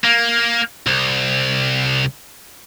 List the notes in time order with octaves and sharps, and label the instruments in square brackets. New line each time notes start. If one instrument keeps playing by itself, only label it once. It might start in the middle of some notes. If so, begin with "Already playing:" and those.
[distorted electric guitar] A#3
C2